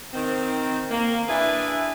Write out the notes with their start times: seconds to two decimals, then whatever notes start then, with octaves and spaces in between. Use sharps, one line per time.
0.14 D#3 C4
0.91 A#3
1.28 D4 E4 G#4 B4 E5 G#5